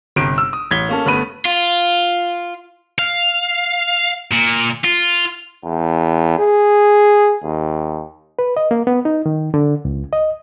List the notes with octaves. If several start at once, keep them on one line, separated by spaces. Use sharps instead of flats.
G1 C3 D7
E6
D#6
A1 G#6 B6 G7
A#3 C#4 A4
G1 A3 B3 B5 D#7
F4
F5
A#2
F4
E2
G#4
D#2
B4
D#5
A#3
B3
D#4
D#3
D3
C#2
D#5